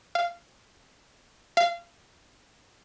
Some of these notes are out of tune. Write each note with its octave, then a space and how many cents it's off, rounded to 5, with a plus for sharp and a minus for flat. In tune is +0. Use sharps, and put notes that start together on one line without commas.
F5 -15
F5 -25